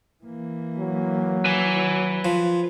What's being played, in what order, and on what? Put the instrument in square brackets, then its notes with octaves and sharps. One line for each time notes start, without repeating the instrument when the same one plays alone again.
[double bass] E3 A#3
[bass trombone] F#3
[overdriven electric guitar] B4 G#5
[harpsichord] F3